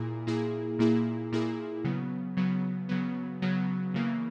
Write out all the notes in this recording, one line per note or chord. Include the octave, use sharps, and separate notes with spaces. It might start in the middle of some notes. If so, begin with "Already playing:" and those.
Already playing: A#2 A#3 E4 G#4
A#2 A#3 E4 G#4
A#2 A#3 E4 G#4
A#2 A#3 E4 G#4
C#3 F#3 B3
C#3 F#3 B3
C#3 F#3 B3
C#3 F#3 B3
C#3 E3 A#3